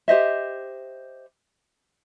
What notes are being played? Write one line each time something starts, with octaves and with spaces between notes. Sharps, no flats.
G4 C5 D#5 E5